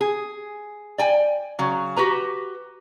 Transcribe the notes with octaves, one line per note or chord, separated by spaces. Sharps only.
G#4
D5 G5 G#5
C#3 F#3
F#4 G4 B4 A#5